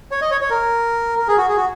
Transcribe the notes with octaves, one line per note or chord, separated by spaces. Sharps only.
C#5
D#5
C#5
C#5
A#4
A#4
G#4
F#4
G#4
F#4